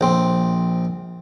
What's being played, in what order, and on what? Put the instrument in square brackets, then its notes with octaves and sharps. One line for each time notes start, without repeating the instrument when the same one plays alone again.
[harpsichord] A#1 C4